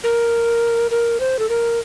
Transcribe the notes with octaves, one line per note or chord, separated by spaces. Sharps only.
A#4
A#4
C5
A4
A#4